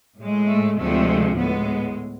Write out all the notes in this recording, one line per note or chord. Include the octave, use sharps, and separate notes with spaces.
A2 G#3
A3
D2 C3 F3 G#3 A3
A2 G#3 B3